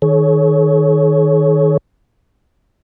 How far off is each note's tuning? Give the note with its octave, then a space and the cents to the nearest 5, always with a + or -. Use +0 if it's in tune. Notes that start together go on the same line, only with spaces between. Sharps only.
D#3 +5 G#4 +45 C#5 +0